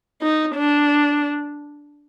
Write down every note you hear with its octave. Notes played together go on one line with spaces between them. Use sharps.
D#4
D4